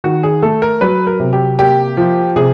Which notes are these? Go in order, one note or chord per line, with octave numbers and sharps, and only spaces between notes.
D#3 F#4
G#4
A3 A4
A#4
F#3 B4
A#4
C3
G4
A#3 G4
F3
C3 G#4